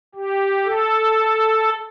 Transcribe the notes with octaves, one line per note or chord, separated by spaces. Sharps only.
G4
A4